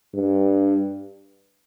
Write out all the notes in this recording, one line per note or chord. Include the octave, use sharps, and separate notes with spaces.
G2